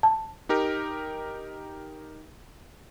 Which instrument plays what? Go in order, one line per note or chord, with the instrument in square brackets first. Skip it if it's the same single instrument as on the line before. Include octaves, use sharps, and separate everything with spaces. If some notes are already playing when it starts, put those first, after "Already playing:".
[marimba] A5
[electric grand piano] D#4 G4 A#4